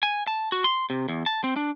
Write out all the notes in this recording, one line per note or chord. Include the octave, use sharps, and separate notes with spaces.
G#5
A5
F#4
C6
C3
E2
A5
C4
D4